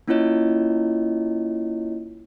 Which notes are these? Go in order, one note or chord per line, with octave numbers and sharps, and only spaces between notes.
A#3 C#4 E4 F4 C#5 D#5